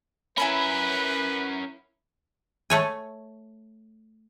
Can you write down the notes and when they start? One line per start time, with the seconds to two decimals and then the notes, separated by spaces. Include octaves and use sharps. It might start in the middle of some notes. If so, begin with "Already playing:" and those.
0.38 C#4 E4 A#4 B4 G#5 B5
2.70 A3 C#5 G#5